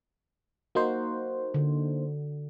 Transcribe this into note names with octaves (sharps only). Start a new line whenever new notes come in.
A#3 D#4 F#4 C5
D3